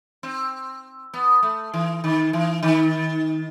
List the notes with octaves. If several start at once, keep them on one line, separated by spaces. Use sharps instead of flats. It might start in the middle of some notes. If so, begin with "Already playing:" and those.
C4
B3
A3
E3
D#3
E3
D#3